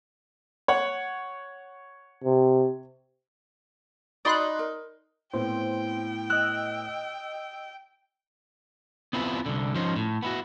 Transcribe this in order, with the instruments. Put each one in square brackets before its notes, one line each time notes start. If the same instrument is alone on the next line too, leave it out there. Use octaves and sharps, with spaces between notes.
[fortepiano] C#5 F#5
[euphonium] C3
[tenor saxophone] D#4 [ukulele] F#4 B5 [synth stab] D5 C6 F#6
[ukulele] A#4
[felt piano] A2 B3 E4 [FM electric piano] C4 C5 [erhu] G5
[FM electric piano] D#5 E6 [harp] F#6
[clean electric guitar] B3 C4 E4 F4 B4
C2 D3
F3 C#4 D#4 C5
A2
B3 E4 F#4